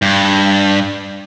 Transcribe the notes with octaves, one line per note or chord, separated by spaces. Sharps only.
G2